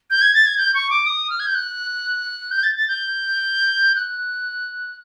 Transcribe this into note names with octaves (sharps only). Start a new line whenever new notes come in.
G6
G#6
A6
G#6
G6
C#6
D6
D#6
F6
G#6
G6
F#6
G6
A6
A6
G6
F#6